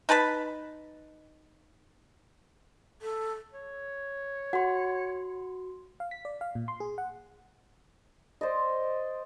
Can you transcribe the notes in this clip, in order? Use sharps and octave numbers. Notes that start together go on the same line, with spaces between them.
D#4 B4 A5 B5
A4
C#5
F#4 F#5 C6
F5
B6
D5
F5
A#2
C6
G#4
F#5
C5 D5 D#5